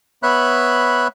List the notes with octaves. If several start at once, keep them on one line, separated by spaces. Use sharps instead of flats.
B3 C#5 E5 B5 F#6